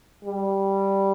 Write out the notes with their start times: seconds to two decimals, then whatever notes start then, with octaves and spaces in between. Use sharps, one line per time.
0.25 G3